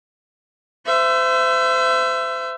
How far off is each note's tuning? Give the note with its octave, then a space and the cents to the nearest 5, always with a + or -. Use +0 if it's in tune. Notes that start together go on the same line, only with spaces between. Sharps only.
C5 -30 E5 +25